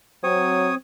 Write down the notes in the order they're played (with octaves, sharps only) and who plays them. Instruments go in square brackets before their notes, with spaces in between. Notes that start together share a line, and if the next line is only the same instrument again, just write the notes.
[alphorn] F#3 [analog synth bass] C4 [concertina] C#5 D#6